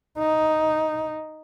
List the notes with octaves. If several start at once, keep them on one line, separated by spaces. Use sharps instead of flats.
D#4